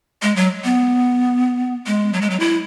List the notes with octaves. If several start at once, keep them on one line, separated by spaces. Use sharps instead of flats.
G#3
F#3
B3
G#3
F#3
G#3
F#3
E4